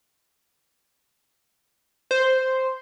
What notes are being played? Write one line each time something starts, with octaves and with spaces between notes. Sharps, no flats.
C5